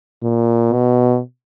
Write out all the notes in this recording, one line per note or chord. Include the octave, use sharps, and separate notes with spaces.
A#2
B2